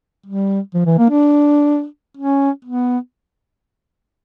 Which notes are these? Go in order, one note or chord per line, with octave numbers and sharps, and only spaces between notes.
G3
F3
E3
A#3
D4
C#4
B3